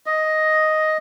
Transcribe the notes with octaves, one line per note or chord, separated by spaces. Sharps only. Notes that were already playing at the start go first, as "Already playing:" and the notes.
D#5